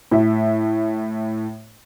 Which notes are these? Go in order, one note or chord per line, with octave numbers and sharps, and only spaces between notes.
A2 E5